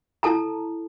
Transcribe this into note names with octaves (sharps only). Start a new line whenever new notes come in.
E4 A4 A5 A#5